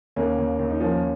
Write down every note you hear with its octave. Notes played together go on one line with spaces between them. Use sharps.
D#2 A#3 C#4
D#2
D#2
D#4
F3 A#3 C#4